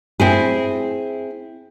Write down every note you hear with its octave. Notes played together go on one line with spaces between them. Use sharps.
C4 E4 G#4